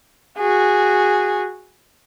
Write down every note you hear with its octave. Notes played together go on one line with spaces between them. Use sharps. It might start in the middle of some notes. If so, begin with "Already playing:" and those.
F#4 G#4